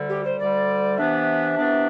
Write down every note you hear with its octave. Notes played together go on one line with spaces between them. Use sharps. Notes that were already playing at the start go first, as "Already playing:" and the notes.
Already playing: D2 D3 G3
G4
C5
D2 D3 G3 D5
C3 E3 B3 D4 E5
C3 E3 B3 D4